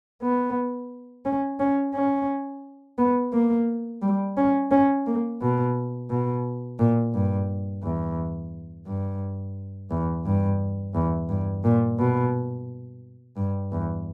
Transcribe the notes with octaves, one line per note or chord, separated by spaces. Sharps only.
B3
C#4
C#4
C#4
B3
A#3
G3
C#4
C#4
A#3
B2
B2
A#2
G2
E2
G2
E2
G2
E2
G2
A#2
B2
G2
E2